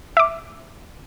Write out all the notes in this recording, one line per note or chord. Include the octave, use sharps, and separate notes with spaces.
E5 D6